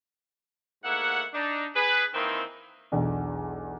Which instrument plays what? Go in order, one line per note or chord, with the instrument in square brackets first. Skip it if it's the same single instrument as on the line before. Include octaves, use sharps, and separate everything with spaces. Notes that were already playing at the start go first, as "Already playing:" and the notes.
[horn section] G#2 A3 A#3 E4 F#5
D4 D#4
G#4 B4
D#3 E3 A#3 C4
[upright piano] B1 E2 D4